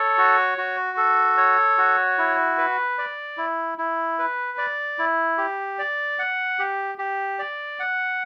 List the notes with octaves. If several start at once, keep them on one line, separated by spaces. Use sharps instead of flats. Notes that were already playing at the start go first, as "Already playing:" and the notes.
Already playing: A4 C#5
F#4
F#4
A4
C#5
F#4
E4
B4
D5
E4
E4
B4
D5
E4
G4
D5
F#5
G4
G4
D5
F#5